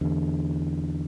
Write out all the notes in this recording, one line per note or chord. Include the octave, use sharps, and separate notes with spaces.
E2 D3